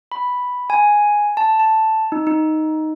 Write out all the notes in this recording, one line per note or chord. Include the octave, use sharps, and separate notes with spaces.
B5
G#5
A5
A5
D#4
D#4